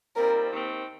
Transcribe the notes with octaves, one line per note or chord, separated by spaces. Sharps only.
A#2 G3 C4 D#4 A#4
D#2 D#3 C4